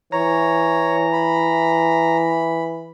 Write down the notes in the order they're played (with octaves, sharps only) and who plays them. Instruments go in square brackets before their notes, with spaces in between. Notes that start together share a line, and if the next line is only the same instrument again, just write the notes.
[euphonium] E3 [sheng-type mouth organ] C#5 [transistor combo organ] A#5
[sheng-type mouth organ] B5